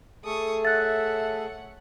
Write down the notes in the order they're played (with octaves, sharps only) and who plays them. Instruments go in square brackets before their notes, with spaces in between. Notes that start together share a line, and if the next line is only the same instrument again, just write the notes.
[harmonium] A3 G#4 A4 [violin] C#6 D#6
[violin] C#5 F#5 [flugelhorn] E5 [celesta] F#6 A6